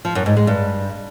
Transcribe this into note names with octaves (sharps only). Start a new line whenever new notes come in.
F3
F#2
G#2
G#3
G2